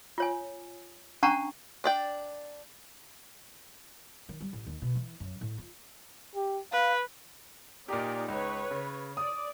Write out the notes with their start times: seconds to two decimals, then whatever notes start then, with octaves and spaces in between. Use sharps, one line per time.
0.18 F4 C#5 G#5
1.23 C#4 D4 F#5 A5 A#5 C#6
1.84 D4 D5 G5
4.29 D#3
4.41 G3
4.53 A1
4.67 D#2
4.82 B2
4.95 E3
5.20 F#2
5.41 A2
5.58 F4
6.35 G4
6.72 B4 F5
7.88 A#2 D#4 G4 A#4 D5
8.28 C#2 B4 C#5
8.71 C#3
9.17 D5 D#6